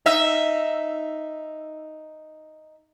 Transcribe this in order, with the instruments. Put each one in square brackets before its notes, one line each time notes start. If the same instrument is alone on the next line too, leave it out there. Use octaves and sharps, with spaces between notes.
[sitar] D#4 E5